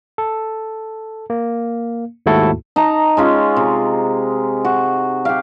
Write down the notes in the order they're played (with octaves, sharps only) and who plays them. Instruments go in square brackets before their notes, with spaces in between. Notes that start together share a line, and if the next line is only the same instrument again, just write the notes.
[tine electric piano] A4
A#3
D#2 G#2 A3 E4 F#4 A4
[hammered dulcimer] D#4 A5 A#5
G#3 C#4 F4
C3
F#4
G4 F5